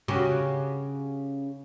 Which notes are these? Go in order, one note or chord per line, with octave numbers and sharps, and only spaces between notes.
C#3 F#4 G4